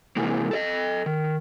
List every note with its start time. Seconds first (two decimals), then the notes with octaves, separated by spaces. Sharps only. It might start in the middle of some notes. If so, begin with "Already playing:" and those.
0.16 C3 E3 G#3 A#3
0.51 A4 D5 D#5
1.06 D#3